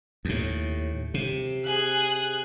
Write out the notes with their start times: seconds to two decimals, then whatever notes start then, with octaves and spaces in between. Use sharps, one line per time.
0.25 D#2 A2
1.14 C3
1.65 G#4 F#6